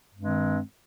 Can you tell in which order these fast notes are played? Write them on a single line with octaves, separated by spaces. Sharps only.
G2 G#3 C4 D#3